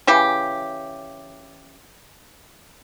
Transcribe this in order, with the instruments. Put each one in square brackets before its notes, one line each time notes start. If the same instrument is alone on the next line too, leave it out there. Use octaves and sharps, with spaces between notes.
[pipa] C#3 E3 G4